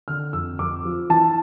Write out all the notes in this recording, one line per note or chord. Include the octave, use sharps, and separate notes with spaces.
D3 F6
F2 E6
F2 D6
F3
E3 A5